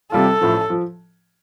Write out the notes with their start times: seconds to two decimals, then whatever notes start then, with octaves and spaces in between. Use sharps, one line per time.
0.12 C3 G3 F4 A4
0.41 A1 A2 F3
0.70 F3